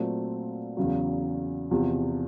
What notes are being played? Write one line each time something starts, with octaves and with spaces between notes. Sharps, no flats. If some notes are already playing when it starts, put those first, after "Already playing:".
Already playing: A#2 F#3 A3 C4
E2 C#3 F#3
E2 C3 F3